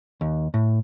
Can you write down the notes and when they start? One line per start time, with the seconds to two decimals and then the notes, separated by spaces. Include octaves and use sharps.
0.21 D#2
0.54 A2